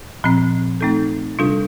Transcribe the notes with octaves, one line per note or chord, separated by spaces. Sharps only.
A#2 F3 C4
A3 C4 D#4 A4
C3 G3 D4 F4 A4